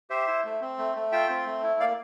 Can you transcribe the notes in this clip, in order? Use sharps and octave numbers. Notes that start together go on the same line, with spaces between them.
G4 C5 E5
E4
A3
C4
A3
A3
F4 E5 G5
C4
A3
E4
A#3 D5 F5